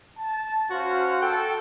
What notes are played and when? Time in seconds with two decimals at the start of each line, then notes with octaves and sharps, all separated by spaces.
0.18 A5
0.70 C#4 F#4 C5 F5
1.22 A4 G5